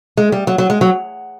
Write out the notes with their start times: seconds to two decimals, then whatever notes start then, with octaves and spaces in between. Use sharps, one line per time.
0.17 G#3
0.32 G3
0.47 F#3
0.58 F#3
0.70 G#3
0.81 F#3